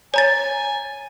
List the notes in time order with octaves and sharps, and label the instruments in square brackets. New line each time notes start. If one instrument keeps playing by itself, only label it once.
[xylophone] C#5 A#5 A6 [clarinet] G#5